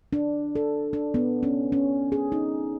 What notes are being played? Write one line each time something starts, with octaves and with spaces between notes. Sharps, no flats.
D4
A4
D4
B3
C#4
C#4
G#4
D#4